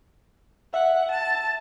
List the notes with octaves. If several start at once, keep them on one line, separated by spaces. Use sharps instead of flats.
E5 F#5
A5